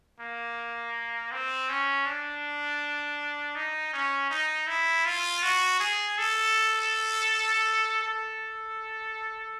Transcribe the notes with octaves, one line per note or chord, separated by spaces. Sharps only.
A#3
C4
C#4
D4
D#4
C#4
D#4
E4
F4
F#4
G#4
A4
A4